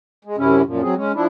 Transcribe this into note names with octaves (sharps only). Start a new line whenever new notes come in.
G#3
F#2 C3 C#4 E4
F#2 A#2 F3
F#3 C4 G#4
G#3 C#4
F3 D4 E4